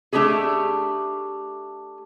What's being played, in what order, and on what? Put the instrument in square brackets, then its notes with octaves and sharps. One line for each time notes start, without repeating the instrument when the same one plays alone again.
[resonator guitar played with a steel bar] A3 D4 D#4 G4 G#4